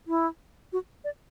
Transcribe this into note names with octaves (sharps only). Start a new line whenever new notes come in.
E4
F#4
D5